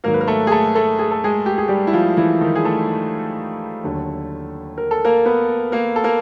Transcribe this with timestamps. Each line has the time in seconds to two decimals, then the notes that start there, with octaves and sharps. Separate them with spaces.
0.04 G#2 D#3 F#3 A#3 A#4
0.14 B4
0.21 A#4
0.27 A3 A4
0.47 G#4
0.52 A3 A4
0.75 A3 A4
0.99 G#4
1.12 A4
1.24 G#3 G#4
1.46 G4
1.58 G#4
1.68 G3 G4
1.87 E4
1.93 F3 F4
2.17 E3 E4
2.41 D#3 D#4
2.56 G#4
2.65 A3 A4
3.84 D#2 D3 F#3
4.78 A#4
4.91 A4
5.05 A#3 A#4
5.25 B3 B4
5.72 A#3 A#4
5.96 A4
6.04 A#3 A#4